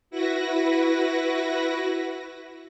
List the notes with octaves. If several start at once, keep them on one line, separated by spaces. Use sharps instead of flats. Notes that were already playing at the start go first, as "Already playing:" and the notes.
E4 F#4 B4 A#6